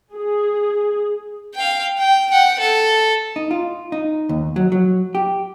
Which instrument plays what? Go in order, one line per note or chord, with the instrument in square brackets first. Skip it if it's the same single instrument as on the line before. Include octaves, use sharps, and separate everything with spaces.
[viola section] G#4
[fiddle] F5 G5
G5
F#5 G5
A4
[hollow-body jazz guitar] D#4
F4
D#4
D#2
F#3
F#3
G4